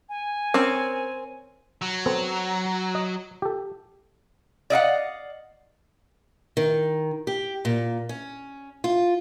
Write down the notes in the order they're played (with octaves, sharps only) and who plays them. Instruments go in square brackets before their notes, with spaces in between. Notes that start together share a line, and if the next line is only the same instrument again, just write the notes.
[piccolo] G#5
[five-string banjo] C4 C#4 [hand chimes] A#4
[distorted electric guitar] F#3
[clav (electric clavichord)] B3 C4 A4
D#5
G4 A4
[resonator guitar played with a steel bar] D5 D#5 F5 F#5
[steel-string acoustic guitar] D#3
G4
A#2
C#4
F4